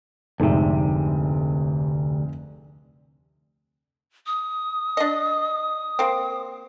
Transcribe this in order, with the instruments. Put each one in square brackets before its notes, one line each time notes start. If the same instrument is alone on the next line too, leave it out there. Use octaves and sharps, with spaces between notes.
[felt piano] F1 G#2 E5 [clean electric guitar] D2 C3
[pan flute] D#6
[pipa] D4 D#5
A#3 C4